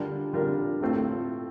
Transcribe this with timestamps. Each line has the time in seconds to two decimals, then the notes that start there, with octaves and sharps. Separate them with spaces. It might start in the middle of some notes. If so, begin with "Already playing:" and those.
Already playing: D3 G3 D4 F4 A#4
0.33 D3 G3 D4 F4 A#4
0.81 A2 A3 C4 F4 A4